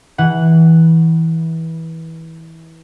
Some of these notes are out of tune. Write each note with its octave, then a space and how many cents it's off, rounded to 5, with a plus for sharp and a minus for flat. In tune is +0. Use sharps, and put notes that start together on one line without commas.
E3 -20 F#5 +0